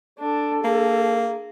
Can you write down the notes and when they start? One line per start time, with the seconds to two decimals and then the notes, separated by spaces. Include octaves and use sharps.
0.19 D4 A4
0.64 A#3 G#4